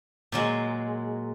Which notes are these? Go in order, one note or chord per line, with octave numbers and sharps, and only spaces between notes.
A#2 F#3 G#3